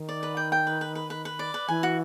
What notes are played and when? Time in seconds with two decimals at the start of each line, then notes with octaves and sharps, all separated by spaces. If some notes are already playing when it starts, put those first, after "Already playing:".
Already playing: D#3
0.09 D5
0.23 B4
0.37 G5
0.52 G5
0.67 B4
0.81 B4
0.95 B4
1.10 B4
1.25 B4
1.39 D5
1.54 B4
1.68 E3 G#5
1.83 F#4